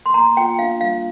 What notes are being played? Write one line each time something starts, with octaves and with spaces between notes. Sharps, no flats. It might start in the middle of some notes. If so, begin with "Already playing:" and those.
C6
A#3 A#5
F4 G5
D4 F5
G3 F5